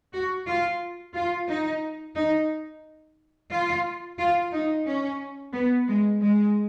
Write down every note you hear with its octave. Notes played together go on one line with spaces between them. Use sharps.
F#4
F4
F4
D#4
D#4
F4
F4
D#4
C#4
B3
G#3
G#3